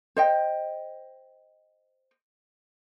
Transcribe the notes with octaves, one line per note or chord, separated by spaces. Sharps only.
C5 D#5 G5